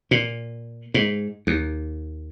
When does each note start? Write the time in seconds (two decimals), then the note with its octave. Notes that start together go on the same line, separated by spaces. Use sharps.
0.11 A#2
0.94 G#2
1.47 D#2